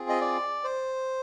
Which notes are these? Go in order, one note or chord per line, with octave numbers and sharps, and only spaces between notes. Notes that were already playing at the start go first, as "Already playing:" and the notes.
Already playing: C4 F4 G#4
D#5
D5
C5